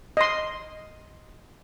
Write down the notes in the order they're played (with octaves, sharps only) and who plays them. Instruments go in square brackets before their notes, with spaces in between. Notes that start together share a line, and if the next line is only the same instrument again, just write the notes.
[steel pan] D#5 C6